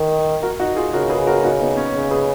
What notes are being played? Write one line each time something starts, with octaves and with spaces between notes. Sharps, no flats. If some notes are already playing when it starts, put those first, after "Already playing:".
Already playing: D#3
F#4 A#4
D#4 F#4
F4 G#4
C#3 F#4 A#4
G#4 B4
F#4 A#4
D#4 F#4
B3 D#4
C#4
C#3
G#4 B4